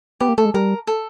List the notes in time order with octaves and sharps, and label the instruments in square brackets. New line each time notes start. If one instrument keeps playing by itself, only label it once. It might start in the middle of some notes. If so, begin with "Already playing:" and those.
[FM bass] B3 [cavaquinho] G4
[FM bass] A#3
[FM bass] A3 [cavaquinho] A4
[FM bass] G#3
[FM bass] G3 [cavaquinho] A#4
[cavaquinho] A4